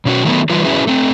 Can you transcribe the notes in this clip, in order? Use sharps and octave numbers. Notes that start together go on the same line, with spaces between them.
B2 C#4 F#4
D#3 F#3 G3 A3 B3
E3 F#3 G3 F4 B4
C#4 E4 F#4 G#4 B4 E5
A3 C4